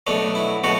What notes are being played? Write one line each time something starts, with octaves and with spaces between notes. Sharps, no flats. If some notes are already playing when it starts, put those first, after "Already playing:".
B2 F#3 A3 D4
E4
B2 F#3 A3 F#4